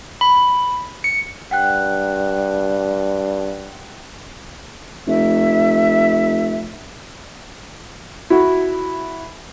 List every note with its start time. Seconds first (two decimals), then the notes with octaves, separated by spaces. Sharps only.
0.21 B5
1.04 C#7
1.51 G2 F#5 G5 F#6
5.07 F1 E5
8.30 E4 F#4